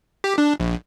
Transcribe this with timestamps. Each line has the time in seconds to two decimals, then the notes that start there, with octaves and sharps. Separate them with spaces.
0.24 G4
0.38 D4
0.60 A#1